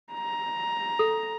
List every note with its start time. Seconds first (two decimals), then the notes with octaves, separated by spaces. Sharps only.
0.13 A#5
0.99 A4